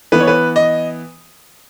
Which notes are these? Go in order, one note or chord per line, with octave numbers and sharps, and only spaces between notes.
E3 B3 B4
C#5
B4
D#5